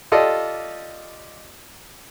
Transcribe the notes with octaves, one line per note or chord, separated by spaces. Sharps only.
F4 G4 A4 D5 D#5